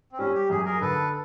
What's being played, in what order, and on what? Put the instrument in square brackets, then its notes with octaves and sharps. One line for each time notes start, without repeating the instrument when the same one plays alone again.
[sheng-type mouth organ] C4
[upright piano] G3 [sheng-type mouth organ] C#4
[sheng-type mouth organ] G4
[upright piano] F#2 [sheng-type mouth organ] G#4
[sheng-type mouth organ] G#4 A#4
[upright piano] D3 [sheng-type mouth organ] A4 B4